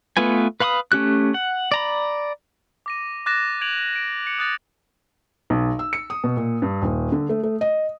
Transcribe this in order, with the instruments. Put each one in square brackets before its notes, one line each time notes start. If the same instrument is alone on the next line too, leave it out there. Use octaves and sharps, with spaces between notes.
[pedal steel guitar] A3 B3 F4 B4 G#5
B4 F5 B5 C#6 D#6
A3 C#4 G4 F#6
F#5
D5 A#5 B5
[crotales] D6 A#6 D#7
D6 F#6 A6 A#6 E7
G#6 D7 F7 F#7
D7
C#7
D#6 F#6 A6 F7
[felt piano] B1
E6
C#7
D#6
B2
A#2
G2
D#1
D3
A3
A3
D#5